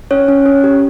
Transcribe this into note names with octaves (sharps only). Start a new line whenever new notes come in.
C#4 C#5
C#4
C#4
G4